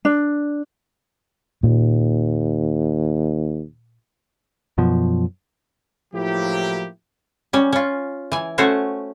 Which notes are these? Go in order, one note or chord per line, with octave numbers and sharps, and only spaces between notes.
D4
D#2 A#2
F#2 B2 F3
A2 F3 F#3 A#3 E4 G4
G3 C#4
C#4 F4
E3 G#5
A3 C#4 F#4 C5 C#5